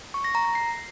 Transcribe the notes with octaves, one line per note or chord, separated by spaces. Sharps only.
C#6
A#6
A#5
A#6
C7